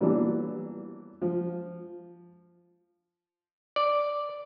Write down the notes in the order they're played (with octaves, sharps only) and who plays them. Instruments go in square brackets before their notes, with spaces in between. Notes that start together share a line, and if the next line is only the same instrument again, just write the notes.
[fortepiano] A#2 E3 F#3 G3 B3 D4
F3
[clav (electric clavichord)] D5